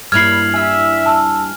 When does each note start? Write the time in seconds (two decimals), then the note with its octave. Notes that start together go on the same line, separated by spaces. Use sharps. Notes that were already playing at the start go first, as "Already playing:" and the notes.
0.12 G2 A#3 E4 F6 G#6 C7 F7 F#7
0.54 E5 G#5 F6
1.06 A5 E6